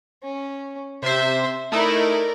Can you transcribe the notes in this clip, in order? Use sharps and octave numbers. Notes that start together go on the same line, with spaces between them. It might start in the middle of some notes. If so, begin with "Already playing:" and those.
C#4
C3 C5 E5
A3 D#4 E4 A#4 D5